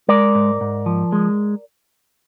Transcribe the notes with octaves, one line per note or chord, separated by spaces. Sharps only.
G#3 A#4 D5
G#2
G#2
F3
G#3